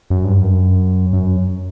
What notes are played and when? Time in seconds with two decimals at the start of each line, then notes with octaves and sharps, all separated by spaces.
0.10 F#2
0.24 G2
0.38 F#2
1.13 F#2